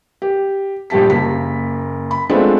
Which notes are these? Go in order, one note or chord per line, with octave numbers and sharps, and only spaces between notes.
G4
A#1 G3 G4 A5 B6
F#1 A#3 B6
B5
G#3 A3 B3 C4 D4 F4